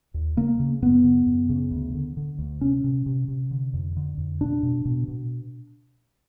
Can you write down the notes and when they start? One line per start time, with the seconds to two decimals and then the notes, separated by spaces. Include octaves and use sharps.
0.14 D#2
0.37 C#3 A#3
0.60 C#3
0.82 F#2 B3
1.04 C#3
1.27 F#2
1.49 C#3
1.71 D2
1.94 D3
2.17 D3
2.38 D2
2.61 C3 C#4
2.84 C3
3.06 C3
3.28 C3
3.51 D3
3.74 F2
3.97 D3
4.18 F2
4.41 B2 D4
4.63 B2
4.85 B2
5.08 B2